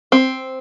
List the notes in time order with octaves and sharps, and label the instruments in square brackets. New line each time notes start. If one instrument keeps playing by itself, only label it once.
[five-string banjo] C4